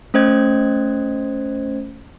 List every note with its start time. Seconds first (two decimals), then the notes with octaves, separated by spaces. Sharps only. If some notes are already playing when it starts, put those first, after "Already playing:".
0.14 A3 C#4 C5 D#5 G#6